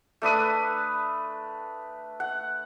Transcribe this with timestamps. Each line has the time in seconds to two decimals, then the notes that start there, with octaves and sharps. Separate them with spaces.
0.22 A3 D4 B4 D#6
2.20 F#5